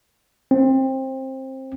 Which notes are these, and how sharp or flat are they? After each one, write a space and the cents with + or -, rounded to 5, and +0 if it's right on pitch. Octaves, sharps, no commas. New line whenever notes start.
C4 +20